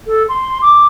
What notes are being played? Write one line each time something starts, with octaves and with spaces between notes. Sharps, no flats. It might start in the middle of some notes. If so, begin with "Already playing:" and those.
A4
C6
D6